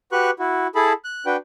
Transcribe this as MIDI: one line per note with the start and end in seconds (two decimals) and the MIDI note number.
0.12 0.31 66
0.12 0.31 67
0.12 0.31 71
0.12 0.31 85
0.12 0.31 90
0.39 0.67 64
0.39 0.67 66
0.75 0.93 64
0.75 0.93 68
0.75 0.93 69
0.75 0.93 81
0.75 0.93 83
1.04 1.26 90
1.26 1.37 62
1.26 1.37 66
1.26 1.37 71
1.26 1.37 79